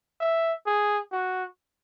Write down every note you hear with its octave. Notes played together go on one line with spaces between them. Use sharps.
E5
G#4
F#4